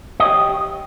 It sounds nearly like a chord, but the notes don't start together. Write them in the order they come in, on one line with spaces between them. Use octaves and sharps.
D#5 C#5 G4